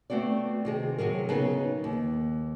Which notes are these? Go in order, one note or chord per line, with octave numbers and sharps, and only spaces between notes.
A3 B3 C4 F#4 D5
C3 D#3 G#4
C3 F3 F#3 G#4 A#4
C#3 B3 D#4 G#4
D#2